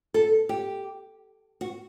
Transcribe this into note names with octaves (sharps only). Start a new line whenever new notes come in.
A4
G4
F#4